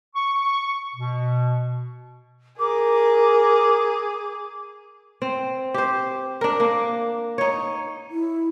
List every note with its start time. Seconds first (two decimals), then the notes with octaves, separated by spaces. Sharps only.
0.15 C#6
0.95 B2
2.59 G#4 A#4 D6
5.22 C4
5.74 G4 C5
6.41 D4 A#4
6.60 A#3
7.38 D#4 C#5
8.11 E4